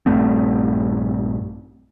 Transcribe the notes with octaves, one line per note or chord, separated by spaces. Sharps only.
A#1 G2 A3 C4